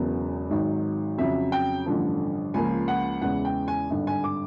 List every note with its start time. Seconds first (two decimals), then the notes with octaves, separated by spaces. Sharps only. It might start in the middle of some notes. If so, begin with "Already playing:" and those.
Already playing: E1 E2 C#3 F#3 B3
0.51 G#1 G#2 D#3 F#3
1.18 F2 C#3 F#3 E5
1.52 G5
1.86 A1 G2 D3 F3
2.54 C#2 C#3 F3 A#3 G#5
2.88 F#5
3.22 E2 C#3 E3 G#3 F#5
3.45 G5
3.68 G#5
3.90 G#1 G2 D3
4.07 G#5
4.24 D6